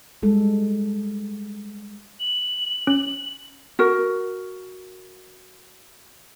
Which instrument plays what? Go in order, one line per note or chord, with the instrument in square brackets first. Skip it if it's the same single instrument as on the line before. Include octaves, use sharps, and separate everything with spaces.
[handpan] G3 G#3 A4
[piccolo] F#7
[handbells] C#4
[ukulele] F#4 A#4